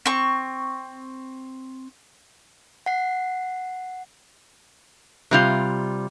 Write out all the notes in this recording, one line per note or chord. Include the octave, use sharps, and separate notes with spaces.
C4 C#6
F#5 C7
C3 G3 F4